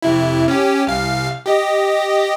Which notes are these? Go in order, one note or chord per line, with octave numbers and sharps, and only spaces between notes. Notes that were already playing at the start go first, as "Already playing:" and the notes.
F2 C3 E4
C#4 G4
C2 F5
G4 D#5